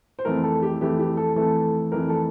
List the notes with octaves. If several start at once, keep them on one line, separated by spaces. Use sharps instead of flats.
C5
F2 E3 A3 A#4
A4
G4
F2 E3 A3 G4
G4
A4
F2 E3 A3 A4
F2 E3 A3 A#4
A4